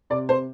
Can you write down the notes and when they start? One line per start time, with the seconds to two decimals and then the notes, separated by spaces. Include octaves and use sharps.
0.10 C3 D5
0.29 C3 C5